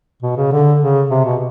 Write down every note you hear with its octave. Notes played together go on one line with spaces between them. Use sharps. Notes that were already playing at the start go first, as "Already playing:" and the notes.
B2
C#3
D3
C#3
C3
B2